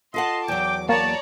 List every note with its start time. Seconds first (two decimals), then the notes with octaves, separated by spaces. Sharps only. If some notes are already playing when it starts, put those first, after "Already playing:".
0.14 F4 A4 D#5 F#5 A5 C6
0.48 E2 F#3 G5 D6
0.89 A#3 C#5 D5 A5 A#5